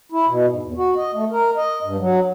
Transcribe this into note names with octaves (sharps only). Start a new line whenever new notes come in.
E4
B2
G#2
E2
F#4
D#5
A3
A#4
D#5
G2
F#3